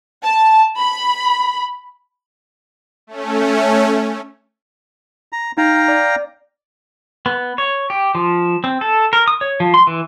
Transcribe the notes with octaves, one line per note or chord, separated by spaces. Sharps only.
A5
B5
A3 C#4
A#5
D#4 F5 G5 A#5
D5
B3
C#5
G4
F3
C4
A4
A#4
D#6
C#5
F3
C6
E3